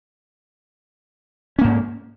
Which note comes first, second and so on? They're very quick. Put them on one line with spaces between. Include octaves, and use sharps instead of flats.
C#4 A#3 G#2